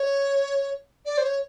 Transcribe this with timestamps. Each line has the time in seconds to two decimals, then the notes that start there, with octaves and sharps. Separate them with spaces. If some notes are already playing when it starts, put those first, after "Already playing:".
Already playing: C#5
1.05 D5
1.18 C5
1.24 C#5